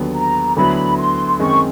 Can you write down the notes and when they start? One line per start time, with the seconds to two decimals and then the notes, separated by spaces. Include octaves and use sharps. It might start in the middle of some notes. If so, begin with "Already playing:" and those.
Already playing: D#2 D3 F#3 B3
0.15 A#5
0.56 D2 D3 F#3 B3 E4 B5
0.97 C6
1.39 F#2 D#3 G#3 C4 C#6